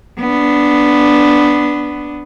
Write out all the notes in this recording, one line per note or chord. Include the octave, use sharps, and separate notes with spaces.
B3 D4